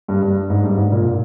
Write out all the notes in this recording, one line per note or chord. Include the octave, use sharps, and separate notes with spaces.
G2
G2
G#2
G2
G#2
A#2